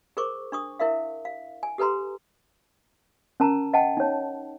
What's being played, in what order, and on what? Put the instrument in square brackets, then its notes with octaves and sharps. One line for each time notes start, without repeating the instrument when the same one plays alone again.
[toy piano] G#4 A#4 C5 C#6 D6
D4 C#6 D#6
E4 A#4 E5 F5
F5
G#5
G4 A4 B4 A#5 C6
C#4 A#4 A5 A#5
D#5 F#5 G5 A5
D#4 C#5